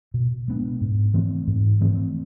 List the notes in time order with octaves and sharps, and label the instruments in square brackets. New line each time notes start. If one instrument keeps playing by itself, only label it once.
[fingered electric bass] B2
G#3 B3 D4
G#2
E3 A3 C4
G#2
E3 A3 C4